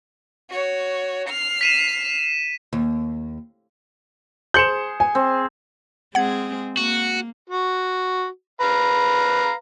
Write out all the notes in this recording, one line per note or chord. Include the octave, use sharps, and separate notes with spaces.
F#4 C#5
F6 C7
B6 D#7 E7
D#2
G#4 C5 C6 G6 C#7 E7 F#7
G#5
C4
G#3 C4 G#4 F#5 G#6
A#3 F#4
F#4
B4 F5 A#5